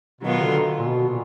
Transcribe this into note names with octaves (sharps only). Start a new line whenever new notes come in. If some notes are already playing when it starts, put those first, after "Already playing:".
B2 D#3 F#3 B3 F4
D3
A#2
B2
A#2